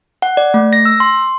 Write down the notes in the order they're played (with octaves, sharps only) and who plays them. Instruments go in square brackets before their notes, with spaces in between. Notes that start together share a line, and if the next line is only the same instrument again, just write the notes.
[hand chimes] F#5
D5
A3
A#6
E6
C6